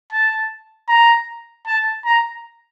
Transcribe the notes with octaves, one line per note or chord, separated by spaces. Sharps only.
A5
A#5
A5
A#5